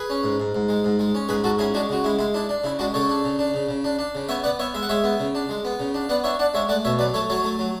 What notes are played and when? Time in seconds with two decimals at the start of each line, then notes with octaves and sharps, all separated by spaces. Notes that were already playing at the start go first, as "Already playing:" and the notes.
Already playing: G#4 B4
0.10 C#4
0.24 G#2
0.40 G#2
0.55 G#2
0.69 G#3
0.84 G#2
0.99 G#3
1.15 C#4
1.29 G#2 G#4 B4
1.44 G#2 F#4 A4
1.59 C#4 E4 G#4
1.74 G#3 D4 F#4
1.89 C#3 F#4
2.04 G#3 E4
2.19 G#3 E4
2.34 D4 E4
2.49 D4
2.64 C#3 E4
2.79 G#3 D4 F#4
2.94 C#3 A4 C#5
3.09 D4
3.24 C#3
3.39 D4
3.54 C#3
3.69 C#3
3.84 D4
3.99 D4
4.15 C#3
4.29 B3 C#5 E5
4.44 B3 D5 F#5
4.59 B3 C#5 E5
4.74 G#3 E5
4.83 F#5
4.89 G#3 C#5 E5
5.04 B3
5.20 C#3
5.35 D4
5.49 G#3
5.65 B3
5.80 C#3
5.94 D4
6.09 B3 D5 F#5
6.24 D4 C#5 E5
6.39 D4 D5 F#5
6.54 G#3 C#5 E5
6.69 A3 D5 F#5
6.85 B2 C#5 E5
6.99 F#3 B4 D5
7.14 A3 A4 C#5
7.30 F#3 A4 C#5
7.44 A3
7.59 F#3